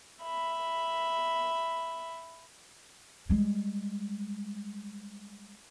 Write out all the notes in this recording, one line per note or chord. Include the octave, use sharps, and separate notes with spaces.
E5 B5
G3 G#3